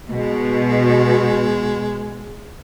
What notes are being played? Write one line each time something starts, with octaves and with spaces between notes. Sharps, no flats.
B2 G#3